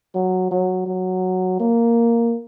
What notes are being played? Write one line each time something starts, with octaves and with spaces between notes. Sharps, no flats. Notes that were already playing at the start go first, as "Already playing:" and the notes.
F#3
F#3
F#3
A#3